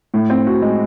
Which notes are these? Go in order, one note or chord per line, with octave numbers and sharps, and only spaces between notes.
A2
C4
F#4
G#3